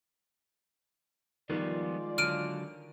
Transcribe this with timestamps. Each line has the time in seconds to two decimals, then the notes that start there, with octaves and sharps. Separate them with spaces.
1.50 D#3 F3 G3 G#3 B3 F4 D5
2.18 D3 F#3 F6 D7 D#7